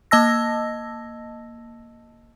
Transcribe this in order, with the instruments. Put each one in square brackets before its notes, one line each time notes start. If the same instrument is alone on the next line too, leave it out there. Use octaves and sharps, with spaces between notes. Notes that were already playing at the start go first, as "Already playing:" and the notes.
[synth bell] A#3 D#5 A5 E6 A#6